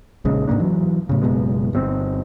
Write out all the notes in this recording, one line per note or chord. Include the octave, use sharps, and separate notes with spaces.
A#1 F2 C#3 G#3
G#2 C3 A#3 D4
E3 F#3
A2 C#3
F#1 B2 G#3 B3
G1 C3 C4